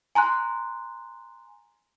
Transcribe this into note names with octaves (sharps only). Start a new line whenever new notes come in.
G#5 A#5 C6 F#6